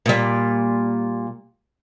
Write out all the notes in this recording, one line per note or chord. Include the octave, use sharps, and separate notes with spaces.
A#2 G3